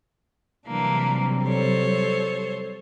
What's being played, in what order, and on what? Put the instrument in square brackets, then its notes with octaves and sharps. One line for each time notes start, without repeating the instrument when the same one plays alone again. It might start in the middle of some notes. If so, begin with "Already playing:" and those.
[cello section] C3 F#3 G3 [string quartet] E3 A#3 D4
[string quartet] A4 C5 C#5